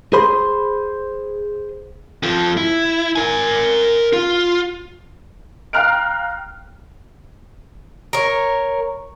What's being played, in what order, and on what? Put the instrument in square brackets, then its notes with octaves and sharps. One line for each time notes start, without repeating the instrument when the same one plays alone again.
[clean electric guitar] G#4 C5 B5 C6
[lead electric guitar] F2 F3
E4
A#4 G#5
F4
[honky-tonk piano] F5 G5 A#5 F6 F#6 D7
[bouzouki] A#4 C#5